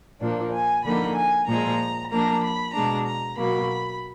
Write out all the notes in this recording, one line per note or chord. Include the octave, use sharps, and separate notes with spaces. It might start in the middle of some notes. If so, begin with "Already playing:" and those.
A#2 F3 A#3 D4
G#5
D3 F3 A#3 D#4 B5
G#5
A#2 F3 G#3 A#5
F3 A#3 D4 A#5
B5
B2 G#3 D4 A#5
A#5
B2 F#3 A#3 B5